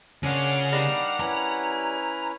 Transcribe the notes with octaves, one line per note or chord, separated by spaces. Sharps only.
A#2 C#3 C#4 D4 F#5 F6
G3 D4 D#4 A#4 F5
C#4 E4 B4 A#5